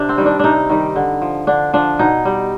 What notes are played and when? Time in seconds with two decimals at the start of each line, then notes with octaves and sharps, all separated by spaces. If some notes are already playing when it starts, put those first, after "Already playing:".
Already playing: C3 D4
0.09 C4
0.18 D#3 G3
0.26 D4
0.39 C3 D4 D#4
0.70 D#3 G3
0.96 D3
1.22 F3
1.47 D3 D4
1.73 F3 D4
1.99 B2 D#4
2.25 G3